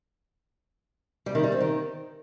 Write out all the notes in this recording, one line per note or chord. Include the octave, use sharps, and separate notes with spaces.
G3
D#3
G3
C4
D#3